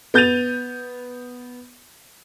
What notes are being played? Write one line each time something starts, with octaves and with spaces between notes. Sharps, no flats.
B3 G6 A6 D#7 F7